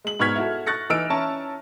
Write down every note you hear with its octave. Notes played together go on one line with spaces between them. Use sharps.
G#3 F#7
G#2 B3 C#6 F6 G#6 B6
E4 F#4 A4
C#6 F#6 A6 A#6 C#7
E3 D#4 E6 F6 D7
C#4 E4 C#5 E5 A5 A#5